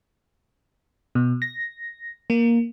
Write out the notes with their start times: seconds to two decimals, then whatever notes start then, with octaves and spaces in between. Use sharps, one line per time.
1.15 B2
1.42 A#6
2.30 A#3